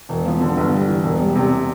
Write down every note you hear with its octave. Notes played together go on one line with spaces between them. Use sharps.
E1
F3
D3
G1
G3
E3
E1
G3
C3